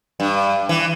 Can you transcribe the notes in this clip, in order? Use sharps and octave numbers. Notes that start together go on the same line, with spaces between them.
G2
E3